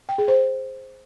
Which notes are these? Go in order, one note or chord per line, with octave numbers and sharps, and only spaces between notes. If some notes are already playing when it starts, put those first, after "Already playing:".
G5
G#4
C5